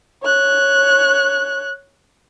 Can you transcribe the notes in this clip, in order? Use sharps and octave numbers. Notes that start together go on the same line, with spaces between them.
C#5 F#6